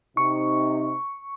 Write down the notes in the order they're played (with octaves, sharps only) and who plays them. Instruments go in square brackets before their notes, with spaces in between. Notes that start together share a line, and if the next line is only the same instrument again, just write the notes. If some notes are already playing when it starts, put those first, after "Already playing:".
[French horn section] C3 D#4 [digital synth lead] C#6